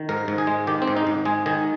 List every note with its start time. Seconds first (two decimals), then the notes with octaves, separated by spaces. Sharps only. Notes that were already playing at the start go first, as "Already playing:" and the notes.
Already playing: D#3
0.09 G#2 A#4
0.28 G#2
0.38 G#4
0.47 G#3
0.67 D#3 G4
0.82 C4
0.87 G#2
0.97 D#4
1.07 G#2
1.25 G#3 G#4
1.46 D#3 G#4